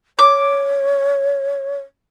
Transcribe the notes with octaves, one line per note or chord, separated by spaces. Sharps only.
C#5 D6